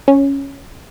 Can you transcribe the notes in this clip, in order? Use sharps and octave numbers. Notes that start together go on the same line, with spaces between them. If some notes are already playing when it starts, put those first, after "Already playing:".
C#4